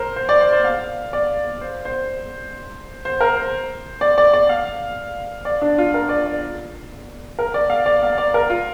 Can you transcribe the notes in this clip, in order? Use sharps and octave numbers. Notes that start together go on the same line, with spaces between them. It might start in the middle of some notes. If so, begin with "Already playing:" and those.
Already playing: A#4 C5
C5
D5
C5
C5
F5
D5
C5
C5
C5
A#4
C5
D5
D5
D5
F5
D5
D4
F4
A#4
D5
D5
A#4
D5
F5
D5
F5
D5
A#4
F4